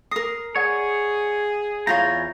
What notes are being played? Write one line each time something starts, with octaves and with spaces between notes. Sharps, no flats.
A#4 D#6 A#6 C7
G#4 C#5 D5 F#5
E2 E4 F4 C#5 F5 A#5 G6